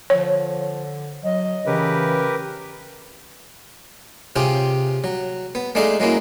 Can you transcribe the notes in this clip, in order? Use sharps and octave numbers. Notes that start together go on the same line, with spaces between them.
D3 F3 C#5
F#3 D#5
C#3 E3 G4 A#4 B4
C3 C#4 F4 G4 G#4
F#3
B3
G#3 A3 D4 D#4 G#4 F5
F#3 G#3 A#3 C#4 E4